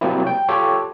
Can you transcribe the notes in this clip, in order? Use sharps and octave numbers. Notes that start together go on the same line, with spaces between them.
C3 F#3 G3 A#3 C4 E4
G5
F4 G4 A4 C#5